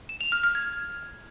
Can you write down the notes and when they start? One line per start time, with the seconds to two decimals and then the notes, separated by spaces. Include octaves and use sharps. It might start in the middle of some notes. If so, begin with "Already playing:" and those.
0.09 E7
0.21 F7
0.32 F6
0.43 F6
0.55 G#6